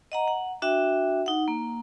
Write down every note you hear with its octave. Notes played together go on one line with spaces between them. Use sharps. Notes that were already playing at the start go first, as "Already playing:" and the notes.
D#5 F#5 A#5
F#5
D4 F#4 E5 G5
D#4 F#5
A#3